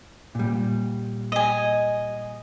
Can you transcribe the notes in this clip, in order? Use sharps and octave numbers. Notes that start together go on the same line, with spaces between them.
A#2 G3
D#5 G#5